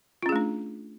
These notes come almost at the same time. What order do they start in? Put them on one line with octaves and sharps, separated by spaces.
F4 C#4 G#4 A3 D4